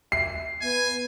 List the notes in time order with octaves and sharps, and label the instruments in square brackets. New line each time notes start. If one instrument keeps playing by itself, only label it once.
[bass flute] E5 [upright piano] C7
[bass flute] B3 [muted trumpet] G#5